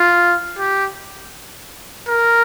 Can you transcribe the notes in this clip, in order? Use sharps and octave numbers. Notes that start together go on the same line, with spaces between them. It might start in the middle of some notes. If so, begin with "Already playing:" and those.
Already playing: F4
G4
A#4